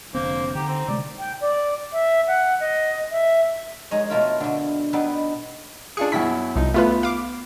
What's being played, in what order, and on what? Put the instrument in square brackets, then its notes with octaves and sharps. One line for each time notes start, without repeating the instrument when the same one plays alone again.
[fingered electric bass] F1 D3 C4 [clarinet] A#3 [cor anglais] C5
[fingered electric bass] D3 [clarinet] D#4 [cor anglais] G4
[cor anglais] C4
[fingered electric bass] C3 G#3 A3 [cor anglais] D5
[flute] G5
D5
E5
F#5
D#5
E5
[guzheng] G#3 D#4 C#5 D#5
B2 A3 F4 A#4
B2 D3
B3 D4 D#4 G4 A4 B4
[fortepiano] D4 F4 G#4 [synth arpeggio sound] C#7
[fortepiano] F#2 B2 E4 [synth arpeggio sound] B6
[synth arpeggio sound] C2 [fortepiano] F3 D#4
[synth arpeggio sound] A3 F4 B4 [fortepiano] B3
[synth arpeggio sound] F5 D6